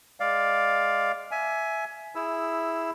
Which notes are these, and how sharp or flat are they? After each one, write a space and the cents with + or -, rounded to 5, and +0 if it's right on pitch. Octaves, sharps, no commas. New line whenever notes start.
G#3 +0 D5 +0 F5 +10
E5 +0 G#5 +20
E4 +0 G#4 +0 E6 +10